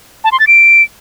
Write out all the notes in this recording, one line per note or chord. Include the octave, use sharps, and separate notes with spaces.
A5
C6
A6
D7